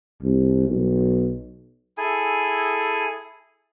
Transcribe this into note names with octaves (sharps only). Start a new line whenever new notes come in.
C2
B1
E4 G#4 A4 G#5